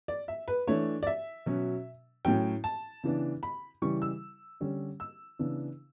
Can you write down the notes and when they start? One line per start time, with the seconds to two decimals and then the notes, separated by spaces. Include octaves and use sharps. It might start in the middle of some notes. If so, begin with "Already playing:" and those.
0.08 D5
0.28 E5
0.48 B4
0.67 E3 A3 D4 C#5
1.03 D5
1.07 E5
1.46 B2 F#3 C#4
2.25 A2 F#3 C#4 G5
2.64 A5
3.04 C#3 E3 B3 D4
3.43 B5
3.82 C#3 E3 G3 C#6
4.02 E6
4.60 D3 G3 C#4
5.00 E6
5.39 C#3 E3 B3 D4